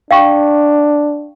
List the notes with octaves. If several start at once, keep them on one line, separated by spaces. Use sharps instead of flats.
D4 F5 G5 C#6